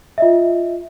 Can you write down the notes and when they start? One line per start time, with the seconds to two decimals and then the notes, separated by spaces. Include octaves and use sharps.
0.18 F4 D#5 E5